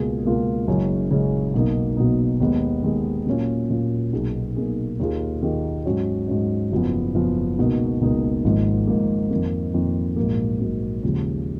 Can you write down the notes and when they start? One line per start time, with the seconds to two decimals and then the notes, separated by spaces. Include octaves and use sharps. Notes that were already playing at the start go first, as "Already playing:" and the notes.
Already playing: C#2 B2 A#3 F4 G#4
0.24 C#2 B2 A#3 F4 G#4
0.68 F#1 F#2 C#3 G#3 C#4
1.11 F#1 F#2 C#3 G#3 C#4
1.54 B1 B2 A#3 D#4
1.97 B1 B2 A#3 D#4
2.40 D#2 D#3 G#3 B3
2.83 D#2 D#3 G#3 B3
3.27 A#2 F#3 A#3 C#4 F4
3.70 A#2 F#3 A#3 C#4 F4
4.13 B1 B2 A#3 D#4 G#4
4.56 B1 B2 A#3 D#4 G#4
5.00 D#2 D#3 A#3 F4 G#4
5.42 D#2 D#3 A#3 F4 G#4
5.86 G#2 F#3 C#4
6.28 G#2 F#3 C#4
6.72 F#1 F#2 F3 B3
7.15 F#1 F#2 F3 B3
7.58 C#2 B2 A#3 D#4
8.01 C#2 B2 A#3 D#4
8.45 G#1 G#2 F3 A#3
8.87 G#1 G#2 F3 A#3
9.31 F2 D#3 A#3
9.74 F2 D#3 A#3
10.16 A#1 G#2 F#3 A#3
10.60 A#1 G#2 F#3 A#3
11.03 D#2 C#3 F3 G#3